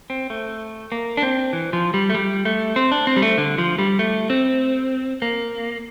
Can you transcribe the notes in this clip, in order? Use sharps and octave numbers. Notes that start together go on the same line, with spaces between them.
C4
A3
A#3
D4
C4
E3
F3
G3
A3
G3
A3
C4
D4
C4
G3
A3
D3
F3
G3
A3
C4
A#3